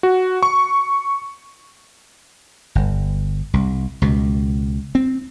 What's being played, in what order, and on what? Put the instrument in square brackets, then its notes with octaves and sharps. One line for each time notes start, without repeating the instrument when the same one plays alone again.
[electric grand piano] F#4
C#6
[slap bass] G1
C2
C#2 B2
C4